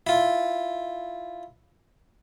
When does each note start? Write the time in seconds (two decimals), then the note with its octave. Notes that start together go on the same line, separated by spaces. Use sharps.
0.07 E4 F4